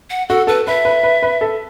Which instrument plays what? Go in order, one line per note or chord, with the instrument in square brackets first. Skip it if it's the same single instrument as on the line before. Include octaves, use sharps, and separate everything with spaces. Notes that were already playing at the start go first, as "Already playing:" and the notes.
[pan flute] F#5
[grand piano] F#4 [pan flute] A4
[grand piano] A4 [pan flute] B4
[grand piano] B4 [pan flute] E5
[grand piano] B4
B4
B4
A4